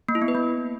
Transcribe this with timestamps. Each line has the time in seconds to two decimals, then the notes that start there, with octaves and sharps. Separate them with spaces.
0.09 A#3
0.15 E4
0.22 B3
0.28 B4
0.35 A#3